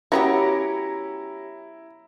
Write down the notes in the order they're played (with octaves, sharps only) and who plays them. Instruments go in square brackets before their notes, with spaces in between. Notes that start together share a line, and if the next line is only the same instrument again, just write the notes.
[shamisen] F#3 B3 [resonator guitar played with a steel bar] C#4 G4 [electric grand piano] E4 [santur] A#5